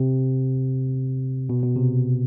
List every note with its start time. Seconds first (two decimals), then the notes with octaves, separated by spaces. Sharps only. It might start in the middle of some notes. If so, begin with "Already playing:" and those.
Already playing: C3
1.49 B2
1.63 B2
1.76 C3